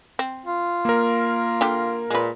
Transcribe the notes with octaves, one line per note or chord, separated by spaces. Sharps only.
C4
F4
A#3 A#4
D3 G4
A#2 G#3 B4